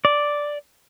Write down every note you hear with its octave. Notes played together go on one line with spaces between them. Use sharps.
D5